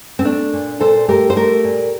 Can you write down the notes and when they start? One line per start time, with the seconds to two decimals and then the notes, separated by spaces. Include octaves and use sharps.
0.19 C4
0.25 A3 D4
0.53 A#2
0.80 A#2 A4 C5
1.08 A3 G4 A#4
1.30 C5
1.36 A3 G4 A#4
1.64 A#2